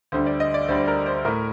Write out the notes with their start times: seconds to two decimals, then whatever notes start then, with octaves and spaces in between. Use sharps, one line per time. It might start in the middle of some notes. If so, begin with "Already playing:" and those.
0.12 D2 D3 G3 C5
0.26 D5
0.40 D#5
0.54 D5
0.68 D2 D3 G3 C5
0.88 A#4
1.06 C5
1.25 A2 A3 A#4